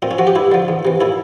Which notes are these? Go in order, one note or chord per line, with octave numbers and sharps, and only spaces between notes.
A#2 C4
C#4
F3 F#4
G4
G2 E4
D3 F3
E2
C3 E3
A#2 E4